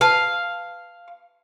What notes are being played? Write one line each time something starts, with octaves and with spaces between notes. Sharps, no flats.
B4 F5 A5